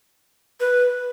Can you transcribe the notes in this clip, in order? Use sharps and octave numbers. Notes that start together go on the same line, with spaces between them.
B4